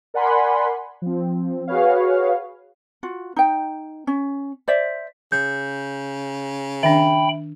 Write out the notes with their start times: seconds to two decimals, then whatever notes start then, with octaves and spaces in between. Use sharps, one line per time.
0.14 A#4 D5 F#5 G#5 B5 C6
1.02 F3 C4
1.68 F#4 G#4 B4 C#5 F5
3.03 F4 F#4
3.36 D#4 G5
4.07 C#4
4.68 C5 D5 E5
5.32 C#3 G6
6.83 D#3 D4 E5 G5 B5